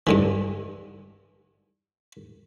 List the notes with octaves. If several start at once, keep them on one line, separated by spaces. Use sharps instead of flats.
G2 D3 E3